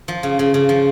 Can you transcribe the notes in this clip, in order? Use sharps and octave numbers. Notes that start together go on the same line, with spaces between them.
F3
C#3
C#3
C#3
F3